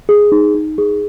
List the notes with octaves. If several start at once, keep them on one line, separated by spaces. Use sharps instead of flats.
G#4
D#4
D#4
G#4